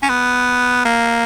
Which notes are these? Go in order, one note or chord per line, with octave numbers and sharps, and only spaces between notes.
C#4
B3
A#3